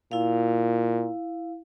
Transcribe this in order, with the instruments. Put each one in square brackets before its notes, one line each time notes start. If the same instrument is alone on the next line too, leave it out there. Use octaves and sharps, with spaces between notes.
[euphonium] A#2 [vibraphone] E4 F5